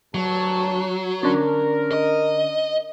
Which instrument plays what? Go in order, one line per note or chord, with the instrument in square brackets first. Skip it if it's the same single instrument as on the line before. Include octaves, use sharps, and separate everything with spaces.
[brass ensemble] D2 G2 A5 [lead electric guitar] F#3
[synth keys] D3 C#4 D4 [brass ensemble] A#4
[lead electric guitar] D#5